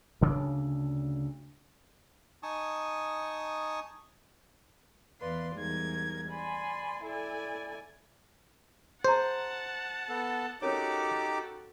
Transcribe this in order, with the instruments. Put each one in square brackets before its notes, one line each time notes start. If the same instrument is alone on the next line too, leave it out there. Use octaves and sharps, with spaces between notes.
[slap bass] D2 C#3 D4
[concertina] D#4 G#5 A5 C#6 D#6
[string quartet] E2 B4 D5 F5 C6
E2 G#2 G3 D#4 A#4 G#6
D5 G#5 B5 C6
E4 A4 D5 G#5
[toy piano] G#4 A#5 [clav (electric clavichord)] C5 [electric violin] F#5 A5
[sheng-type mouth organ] B3 A4
[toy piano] C#4 A#4 C#5 [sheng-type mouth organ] D#4 G4 D6 [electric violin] F#4 A4